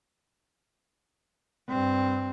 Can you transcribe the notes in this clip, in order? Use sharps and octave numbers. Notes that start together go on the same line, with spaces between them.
G2 C4